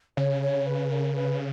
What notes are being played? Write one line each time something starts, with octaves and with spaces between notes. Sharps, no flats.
C#3 C#5
C#5
B4
A#4
B4